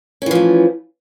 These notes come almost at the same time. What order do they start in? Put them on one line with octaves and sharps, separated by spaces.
C#4 E3 F3 A3